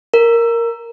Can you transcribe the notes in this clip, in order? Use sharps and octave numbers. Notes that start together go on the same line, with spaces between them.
A#4